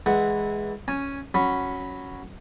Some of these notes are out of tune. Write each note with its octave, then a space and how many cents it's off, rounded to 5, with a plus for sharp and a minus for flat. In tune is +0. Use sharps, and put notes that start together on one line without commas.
E3 -15 G#3 +0 F#5 +0
C#4 +0 G#5 +0
F#3 +0 C#4 +0 B5 -5